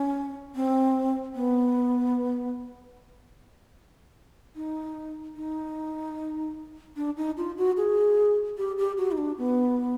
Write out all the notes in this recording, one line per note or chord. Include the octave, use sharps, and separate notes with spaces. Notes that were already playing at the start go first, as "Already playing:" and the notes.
Already playing: C#4
C4
B3
D#4
D#4
D4
D#4
F4
F#4
G#4
G4
G4
F#4
D#4
D4
B3